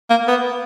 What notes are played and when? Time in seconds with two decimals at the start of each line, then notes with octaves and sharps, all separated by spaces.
0.10 A#3
0.28 B3